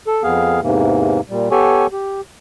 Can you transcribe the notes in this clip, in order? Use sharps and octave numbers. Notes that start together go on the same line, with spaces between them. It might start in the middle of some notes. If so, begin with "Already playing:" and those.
A4
F2 B3 G#4 F5
E2 G#2 C3 E3 A#3
A#2 G3
B3 G4 A4 C#5 G#5
G4